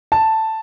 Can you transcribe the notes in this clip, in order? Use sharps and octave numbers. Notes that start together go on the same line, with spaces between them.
A5